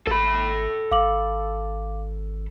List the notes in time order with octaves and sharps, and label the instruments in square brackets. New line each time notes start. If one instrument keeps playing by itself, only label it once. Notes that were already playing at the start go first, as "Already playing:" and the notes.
[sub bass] G#1 [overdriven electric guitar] A4 B5
[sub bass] G#1 [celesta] F5 D6 F#7